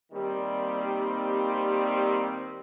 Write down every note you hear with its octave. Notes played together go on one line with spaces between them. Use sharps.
D#2 D#3 G3 C4